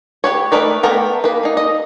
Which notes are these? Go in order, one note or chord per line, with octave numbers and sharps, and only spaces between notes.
G4 B4 C#5
A3 D#4 A#4 B4 D5
A3 B3 A4 A#4 G5
A#3 B3 B4
A#3 D#4
D#5